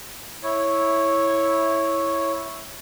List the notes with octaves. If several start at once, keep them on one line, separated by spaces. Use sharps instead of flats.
E4 C#5